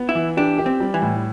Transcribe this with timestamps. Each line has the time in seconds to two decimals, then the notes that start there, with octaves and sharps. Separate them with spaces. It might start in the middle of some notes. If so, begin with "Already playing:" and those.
Already playing: B3
0.09 E4
0.15 E3
0.37 D4 G4
0.58 G4
0.66 C4
0.80 G3
0.94 E3
1.02 A2